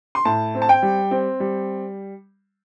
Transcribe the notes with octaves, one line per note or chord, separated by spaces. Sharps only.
C6
A2 A5
C4
A5
G5
G3
C4
G3